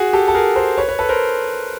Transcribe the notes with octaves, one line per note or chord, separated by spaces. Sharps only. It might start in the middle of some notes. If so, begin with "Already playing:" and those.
Already playing: F#4 G#4
G4 A4
A4
G#4 A#4
A#4 C5
B4 C#5
B4 C#5
A4 B4
A#4 C5